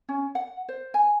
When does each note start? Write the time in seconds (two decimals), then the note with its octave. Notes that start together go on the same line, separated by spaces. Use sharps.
0.09 C#4
0.35 F#5
0.69 C5
0.94 G#5